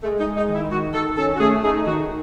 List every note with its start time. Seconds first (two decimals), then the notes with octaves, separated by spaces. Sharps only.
0.03 G#3 A3
0.20 D#4
0.26 G#3
0.37 D#4
0.49 D#3
0.55 E4
0.71 D#3 F#4
0.94 D#3 A4
1.17 C#4 A4
1.36 F#4
1.40 A3 G#4
1.63 D#4 G#4
1.86 D#3 F#4